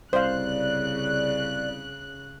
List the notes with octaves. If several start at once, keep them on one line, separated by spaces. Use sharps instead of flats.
C2 C#3 C5 D5 F5 F#6